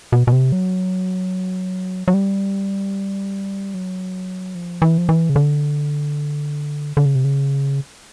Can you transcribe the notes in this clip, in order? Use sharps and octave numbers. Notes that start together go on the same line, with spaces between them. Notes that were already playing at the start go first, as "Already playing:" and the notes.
B2
B2
C3
F#3
F#3
G3
F#3
F3
E3
F3
E3
C#3
D3
D3
C#3
C3
C#3